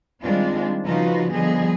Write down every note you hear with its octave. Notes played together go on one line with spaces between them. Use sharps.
D#3 G3 G#3 C4 D4 F4
C#3 F3 D#4 F4 F#4 B4
D3 F3 G3 B3 G#4 D#5